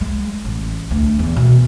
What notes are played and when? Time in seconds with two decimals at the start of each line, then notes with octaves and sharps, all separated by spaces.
0.01 G#3
0.45 A1
0.91 D2
1.19 E2
1.36 B2